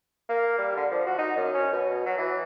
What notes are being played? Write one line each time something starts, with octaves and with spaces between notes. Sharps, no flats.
A#3
G3
D3
F3
F#4
D#4
F#2
C#4
B2
F#3
E3